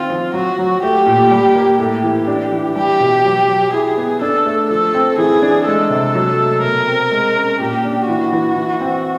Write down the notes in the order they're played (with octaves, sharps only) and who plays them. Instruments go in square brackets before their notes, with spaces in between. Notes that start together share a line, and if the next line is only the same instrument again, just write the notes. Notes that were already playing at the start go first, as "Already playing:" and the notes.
Already playing: [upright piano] D#3 C4 [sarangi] F4
[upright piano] F3
[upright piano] F#3 [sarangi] F#4
[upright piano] F#3
[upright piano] A3 [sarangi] G4
[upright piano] A#2
G3
A#3
[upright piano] A2 [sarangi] G4
[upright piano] E3
D4
E3
[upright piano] G3 [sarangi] G4
[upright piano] B2
F#3
F#3
[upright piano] E4 [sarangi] G#4
[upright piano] B3
[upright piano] D4 [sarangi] A4
[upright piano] A3
[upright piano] F3 [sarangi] A4
[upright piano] C4
[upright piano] E3 [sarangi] G#4
[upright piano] D4
[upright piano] G#3 [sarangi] A4
[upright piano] C3
F#3
A3
[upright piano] B2 [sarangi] A#4
[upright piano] C4
G#3
C#4
[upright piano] A#2 [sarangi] G4
[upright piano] D4
[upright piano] E3 [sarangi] F#4
[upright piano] E3
E3
C4